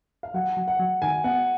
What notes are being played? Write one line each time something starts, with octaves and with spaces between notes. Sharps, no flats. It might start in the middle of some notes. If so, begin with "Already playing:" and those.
F5
F#3 F#5
F#3
F#5
F#3
D#3 G#5
B3 F#5